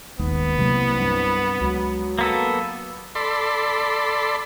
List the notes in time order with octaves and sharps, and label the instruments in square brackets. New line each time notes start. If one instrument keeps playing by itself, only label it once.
[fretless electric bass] D#1 G#1 D#2 [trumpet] B3
[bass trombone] C2 [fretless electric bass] C3 F#3 A#3
[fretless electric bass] G2
[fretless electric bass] C#2 [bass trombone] F#3
[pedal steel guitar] A#3 B3 A4
[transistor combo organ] A4 D5 B5 C6